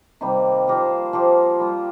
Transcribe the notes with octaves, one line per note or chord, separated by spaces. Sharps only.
C3 D#3 G3 A#3
F3 A#3 G4 C5
F3 A#3 G4 C5
G3 A#3 F4